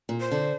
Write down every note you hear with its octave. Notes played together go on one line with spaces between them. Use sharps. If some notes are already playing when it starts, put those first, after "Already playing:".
A#2
C5
D3